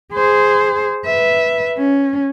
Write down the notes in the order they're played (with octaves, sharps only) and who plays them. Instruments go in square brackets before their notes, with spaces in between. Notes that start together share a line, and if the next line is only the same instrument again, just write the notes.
[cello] G#4 C5
B4 E5
C#4